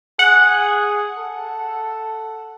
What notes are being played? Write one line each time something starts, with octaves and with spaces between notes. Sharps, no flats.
G#4 F#5
A4